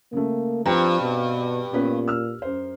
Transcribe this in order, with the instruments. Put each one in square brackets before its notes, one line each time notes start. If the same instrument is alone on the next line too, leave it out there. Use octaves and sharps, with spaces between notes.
[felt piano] C#3 A3 [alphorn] A#3
[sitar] G2 [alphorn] F3 [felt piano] C4 G5 A#5
[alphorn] B2
[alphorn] A#2 [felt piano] B3 C#4 B4
[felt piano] E6 F6
F#2 C5